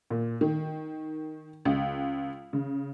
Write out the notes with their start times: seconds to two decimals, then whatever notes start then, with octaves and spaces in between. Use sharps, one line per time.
0.10 A#2
0.41 D#3
1.65 C#2
2.53 C#3